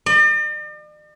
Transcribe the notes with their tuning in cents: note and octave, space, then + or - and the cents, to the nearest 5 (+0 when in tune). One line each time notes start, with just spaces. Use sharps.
D5 +45